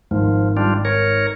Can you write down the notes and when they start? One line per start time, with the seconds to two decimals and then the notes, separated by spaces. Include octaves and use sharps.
0.11 G#1 F3
0.57 G3 D4 F4
0.85 A#4 C#5